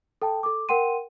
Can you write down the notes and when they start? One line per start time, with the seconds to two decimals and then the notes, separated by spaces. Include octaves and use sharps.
0.22 A4 G5 A5
0.43 A4 D6
0.69 A#4 F#5 G5 C6 D#7